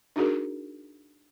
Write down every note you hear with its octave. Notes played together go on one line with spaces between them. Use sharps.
D4 D#4 F#4 G#4 A#4